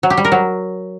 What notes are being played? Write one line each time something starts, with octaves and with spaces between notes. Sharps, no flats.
F#3
G4
G3
A#4
F#3